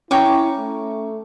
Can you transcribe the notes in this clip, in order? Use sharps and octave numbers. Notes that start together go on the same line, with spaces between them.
C#4 E4 C#5 G5 A#5 D6
A3